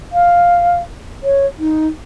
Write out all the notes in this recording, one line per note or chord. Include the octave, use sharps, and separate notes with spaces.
F5
C#5
D#4